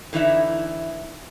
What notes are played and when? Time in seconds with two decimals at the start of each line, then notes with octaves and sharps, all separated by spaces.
0.13 D3 E3 D#4 E4 E5